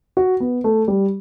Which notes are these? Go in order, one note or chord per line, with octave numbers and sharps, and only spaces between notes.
F#4
B3
A3
G3